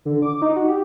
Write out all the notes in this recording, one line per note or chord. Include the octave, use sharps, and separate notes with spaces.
D3
D6
D#4
F#4
G4